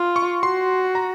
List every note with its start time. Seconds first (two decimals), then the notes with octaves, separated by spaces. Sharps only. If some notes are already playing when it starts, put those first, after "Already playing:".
Already playing: F4
0.16 C#6
0.43 F#4 C6
0.95 A#5